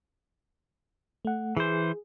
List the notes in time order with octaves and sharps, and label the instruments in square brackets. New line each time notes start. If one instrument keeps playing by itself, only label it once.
[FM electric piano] A3 F#5
[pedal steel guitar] E3 C5 [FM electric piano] G#4